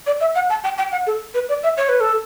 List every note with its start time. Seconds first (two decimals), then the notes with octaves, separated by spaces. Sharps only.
0.07 D5
0.21 E5
0.35 F#5
0.50 A5
0.64 G5
0.78 G5
0.92 F#5
1.07 A4
1.34 B4
1.49 D5
1.63 E5
1.77 C#5
1.89 B4
2.00 A4